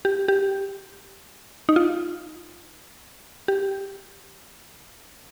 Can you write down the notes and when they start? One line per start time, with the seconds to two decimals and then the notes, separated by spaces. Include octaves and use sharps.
0.05 G4
0.28 G4
1.69 D#4
1.76 F4
3.48 G4